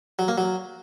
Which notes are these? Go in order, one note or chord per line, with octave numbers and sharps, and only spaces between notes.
F#3
A#3
F#3